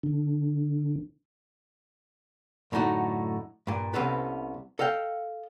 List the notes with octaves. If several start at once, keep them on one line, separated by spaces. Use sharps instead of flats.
D3
F#2 A2 D3 D#4 F#4
G2 A#2
C2 C3 B3 C#4 A4 B4
A4 D#5 F5 G5